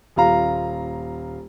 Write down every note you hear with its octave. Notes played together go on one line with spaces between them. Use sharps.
D#1 F4 F5 A#5